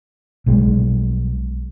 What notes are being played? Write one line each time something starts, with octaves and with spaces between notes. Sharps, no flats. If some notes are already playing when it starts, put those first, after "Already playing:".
B1 G3 G#3